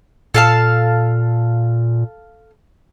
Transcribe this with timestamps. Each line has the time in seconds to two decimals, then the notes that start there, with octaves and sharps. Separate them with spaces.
0.34 A#2 A4 F5 A5